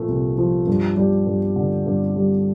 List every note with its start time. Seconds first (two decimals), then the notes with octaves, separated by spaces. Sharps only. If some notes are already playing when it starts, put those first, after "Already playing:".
Already playing: A#2 F3 A3
0.08 C2
0.38 F3
0.67 G2
0.97 G3
1.26 G2
1.56 D3
1.86 G2
2.16 G3